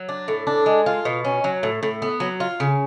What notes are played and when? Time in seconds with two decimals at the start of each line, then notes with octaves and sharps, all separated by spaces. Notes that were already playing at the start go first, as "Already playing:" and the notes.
Already playing: F#3
0.09 D4
0.28 A2
0.47 D4
0.66 G#3
0.86 F4
1.05 B2
1.25 C#4
1.44 F#3
1.63 A2
1.83 A2
2.02 B3
2.20 F#3
2.40 F4
2.60 C#3